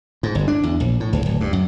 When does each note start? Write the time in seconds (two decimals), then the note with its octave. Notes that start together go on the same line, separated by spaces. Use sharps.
0.23 G#2
0.35 G1
0.48 D4
0.63 E2
0.80 A#1
1.00 A2
1.13 C#2
1.26 D1
1.41 G2
1.53 F#2